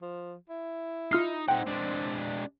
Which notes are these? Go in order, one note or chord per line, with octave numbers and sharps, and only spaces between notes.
F3
E4
D#4 F4 F6 C7
C4 D#4 F#5 G5
G#3 D4